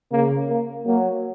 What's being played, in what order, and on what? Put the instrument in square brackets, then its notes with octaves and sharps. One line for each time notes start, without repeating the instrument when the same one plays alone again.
[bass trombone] C#3 [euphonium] A#3
[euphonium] A#3
[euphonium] F#3 [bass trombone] A#3